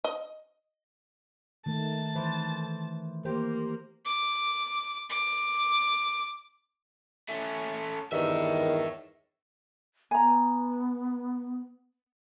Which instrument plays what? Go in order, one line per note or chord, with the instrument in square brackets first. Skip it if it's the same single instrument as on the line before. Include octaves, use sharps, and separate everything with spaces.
[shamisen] D#5
[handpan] D#3 A3 [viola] A5
[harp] E3 [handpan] C5
[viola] A#3 [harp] G4 [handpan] C5
[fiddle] D6
D6
[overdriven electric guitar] A3 C#4
[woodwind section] E2 G2 D#3 [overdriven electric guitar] C#5 E5
[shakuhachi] B3 [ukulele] G#5 A#5